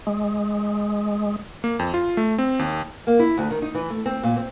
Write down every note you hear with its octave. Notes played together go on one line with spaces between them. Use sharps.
G#3
A#3
F2
F4
A3
C4
D#2
A#3
E4
D2
D#3
D#4
E3
A3
C4
A#2
C4